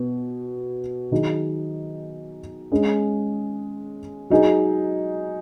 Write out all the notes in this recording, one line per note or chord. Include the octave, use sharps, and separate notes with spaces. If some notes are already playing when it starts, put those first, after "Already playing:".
Already playing: B2 B3
D#3 F#3 D#4 G#4
G#3 C#4 G#4
F#3 D#4 G#4